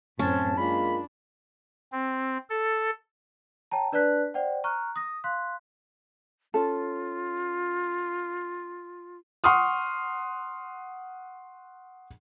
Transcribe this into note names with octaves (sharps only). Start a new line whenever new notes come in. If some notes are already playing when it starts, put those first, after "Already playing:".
F#2 A2 C4 C#4 A5
G#3 A#3 D4 F4 B5
C4
A4
C#5 G5 A5 A#5
D4 B4 D5 A5 F#6 B6
C5 D5 F#5 G5
A#5 C#6 F6 F#6
D#6 A#6
F5 C6 F#6 B6
C#4 F4 A4
F#5 C6 C#6 D#6 F6